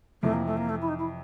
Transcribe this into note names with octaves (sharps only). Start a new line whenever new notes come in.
F2 C3 E3 A3
A#3
A3
A#3
A3
E4
D#4
E4